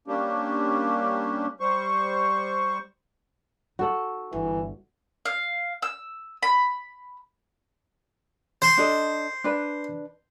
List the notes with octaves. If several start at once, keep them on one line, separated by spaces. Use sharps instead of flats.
G3 A#3 C#4 D4 G4
G3 C5 C#6
D#4 F#4 A4 F#5
G1 E3
F5
E6
B5
C5
D4 A4 D#5
D4 B4